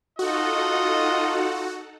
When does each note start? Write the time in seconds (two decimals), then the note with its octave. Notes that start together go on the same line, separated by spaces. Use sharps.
0.19 D#4 F4 F#4 A4 D#5 F#5